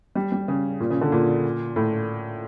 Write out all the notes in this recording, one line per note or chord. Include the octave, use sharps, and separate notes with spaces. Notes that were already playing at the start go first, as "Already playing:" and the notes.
G3
G3
C#3
A#2
C#3
D3
A#2
A2